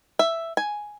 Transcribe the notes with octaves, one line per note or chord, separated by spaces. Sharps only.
E5
G#5